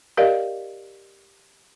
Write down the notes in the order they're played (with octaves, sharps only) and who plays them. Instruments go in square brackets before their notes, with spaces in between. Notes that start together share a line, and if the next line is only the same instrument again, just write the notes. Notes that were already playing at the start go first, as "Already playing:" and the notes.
[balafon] G4 A#4 D5 D#5 F5